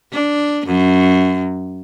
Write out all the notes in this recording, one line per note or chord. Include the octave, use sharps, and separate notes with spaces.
D4
F#2